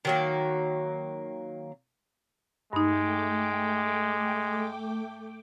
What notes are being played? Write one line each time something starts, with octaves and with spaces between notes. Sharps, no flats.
D#3 F#3 A#3
G2 G#3 A3 D#4 G5 D6